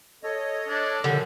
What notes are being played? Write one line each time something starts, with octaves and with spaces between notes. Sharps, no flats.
A4 C#5 D#5
D4
F#2 A#2 D3 F3 G3